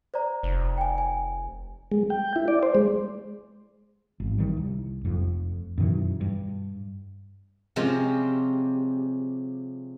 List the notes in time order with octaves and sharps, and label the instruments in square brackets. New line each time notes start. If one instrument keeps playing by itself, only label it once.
[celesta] C5 D5 A#5
[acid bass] F1
[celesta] G5 G#5
G#5
[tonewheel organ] G#3
G5
E4
D5
C5
G#3
[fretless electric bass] G#1
D#3 G3
C2
F1 F2
F#2 B2 D#3 E3
G2
[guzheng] C3 F3 G#3 C4 C#4 G4